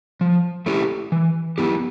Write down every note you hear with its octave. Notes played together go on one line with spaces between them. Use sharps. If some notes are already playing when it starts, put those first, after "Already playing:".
F3
A3 E4 G4
E3
B3 E4 G4